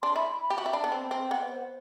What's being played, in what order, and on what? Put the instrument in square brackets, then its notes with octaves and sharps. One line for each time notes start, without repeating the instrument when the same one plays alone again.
[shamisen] D4 [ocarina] C6
[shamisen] E4 [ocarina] B5
[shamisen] G4
F#4
E4
[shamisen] D4 [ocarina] A5 B5
[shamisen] B3
C4
[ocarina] G5
[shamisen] C4
[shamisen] B3 [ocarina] F#5
[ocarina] B4
C5